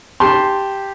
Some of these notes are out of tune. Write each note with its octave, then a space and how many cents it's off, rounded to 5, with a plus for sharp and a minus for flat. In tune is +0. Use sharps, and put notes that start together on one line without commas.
G4 +0 A5 +0 C6 +0